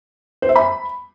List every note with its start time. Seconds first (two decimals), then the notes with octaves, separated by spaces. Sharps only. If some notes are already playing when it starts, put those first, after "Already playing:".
0.42 C5
0.49 E5
0.56 B5